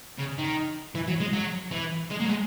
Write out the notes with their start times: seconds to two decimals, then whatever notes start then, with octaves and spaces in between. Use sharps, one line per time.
0.18 C#3
0.38 D#3
0.95 E3
1.08 F#3
1.20 G#3
1.33 F#3
1.72 E3
2.10 G#3
2.20 A#3
2.25 F#3
2.29 G#3